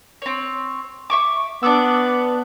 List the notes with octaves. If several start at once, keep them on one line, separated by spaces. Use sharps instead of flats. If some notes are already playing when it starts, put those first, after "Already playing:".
C4 C#5
E5 C#6 D6
B3 D4 D6 E6